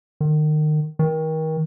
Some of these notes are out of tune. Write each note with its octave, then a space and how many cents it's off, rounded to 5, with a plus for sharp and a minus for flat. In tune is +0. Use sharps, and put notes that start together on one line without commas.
D#3 -30
D#3 +30